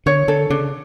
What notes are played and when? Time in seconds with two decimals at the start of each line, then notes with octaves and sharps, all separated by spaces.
0.06 D3 C#5
0.28 D3 A4
0.50 C#3 D4